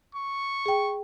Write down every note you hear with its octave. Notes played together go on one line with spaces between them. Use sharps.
C#6
G#4 G5